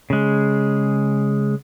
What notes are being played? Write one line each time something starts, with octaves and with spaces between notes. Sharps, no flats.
C#3 G#3